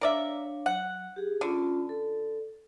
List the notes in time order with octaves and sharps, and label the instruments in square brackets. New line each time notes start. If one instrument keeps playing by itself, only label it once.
[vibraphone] D4 C#5 F5 [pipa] A#4 D5 E5
[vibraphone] F#3 [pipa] F#5
[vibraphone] G4 G#4
[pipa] D3 [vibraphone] C#4 F4 B5
[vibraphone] A4